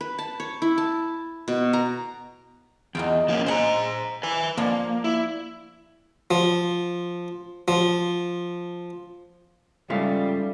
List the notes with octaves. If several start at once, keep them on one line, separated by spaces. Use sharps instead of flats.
B4
A5
C#5
E4
A5
B2
A#5
E2 D#4 F4 G5
F3 A#3 C#4
G#3 C5 F#5 G#5 A#5
B4 G#5
F3 A#3 D4
E4
F3
F3
G#2 C#3 F3 G3 A4 E5 F5